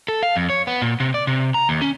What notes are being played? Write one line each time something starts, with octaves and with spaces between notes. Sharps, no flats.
A4
F5
F2
C#5
B3
A#2
C3
D5
C3
A#5
D#2
C#4